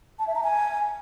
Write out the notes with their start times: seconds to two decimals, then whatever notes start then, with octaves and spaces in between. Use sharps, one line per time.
0.19 A5
0.27 E5
0.35 A#5
0.43 G#5